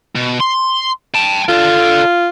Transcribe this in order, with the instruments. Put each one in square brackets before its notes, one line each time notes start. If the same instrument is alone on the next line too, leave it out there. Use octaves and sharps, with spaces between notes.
[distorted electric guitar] B2
C6
G5 A5
[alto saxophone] F4 [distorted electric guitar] A4 D5